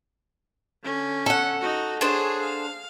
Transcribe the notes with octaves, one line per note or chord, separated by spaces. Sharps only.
D3 C#4
A4 F#5
D#4 F#4
D4 G#4 C5 C#5
F5